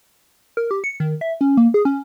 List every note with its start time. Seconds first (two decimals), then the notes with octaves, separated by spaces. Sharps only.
0.57 A#4
0.71 G4
0.84 C#7
1.00 D#3
1.21 E5
1.41 C#4
1.57 A#3
1.74 G#4
1.85 C#4